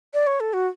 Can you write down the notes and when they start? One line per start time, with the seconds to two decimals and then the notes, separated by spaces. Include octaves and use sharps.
0.14 D5
0.27 C#5
0.40 A4
0.53 F#4